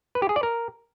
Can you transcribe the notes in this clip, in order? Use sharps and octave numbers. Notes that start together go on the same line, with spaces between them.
B4
G4
G#4
D5
A#4